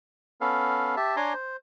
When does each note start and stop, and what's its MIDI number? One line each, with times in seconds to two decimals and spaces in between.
0.41 0.96 59
0.41 0.96 61
0.41 0.96 69
0.41 0.96 77
0.97 1.16 67
0.97 1.16 76
0.97 1.16 81
1.16 1.33 62
1.16 1.33 73
1.16 1.33 80
1.16 1.33 82
1.16 1.33 84
1.16 1.33 86
1.34 1.56 72